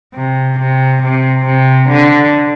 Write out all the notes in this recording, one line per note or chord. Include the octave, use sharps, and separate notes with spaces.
C3
C3
C3
C3
D3